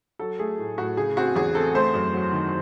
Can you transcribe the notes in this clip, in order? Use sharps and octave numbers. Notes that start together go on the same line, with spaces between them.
F#3 A4
A3 G#4
A2
A2 F#4
C#3 G#4
C4 F#4
E2 G#4
C4 A4
A3 C5
F#2
F#3
D#3